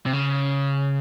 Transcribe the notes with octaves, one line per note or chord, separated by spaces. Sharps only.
C3
C#3